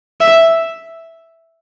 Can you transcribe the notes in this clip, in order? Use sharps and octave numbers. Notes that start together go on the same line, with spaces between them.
E5